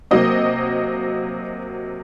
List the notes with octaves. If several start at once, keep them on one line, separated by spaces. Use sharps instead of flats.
C3 F#3 A#3 D#5